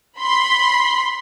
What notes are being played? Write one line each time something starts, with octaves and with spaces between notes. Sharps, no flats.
B5 C6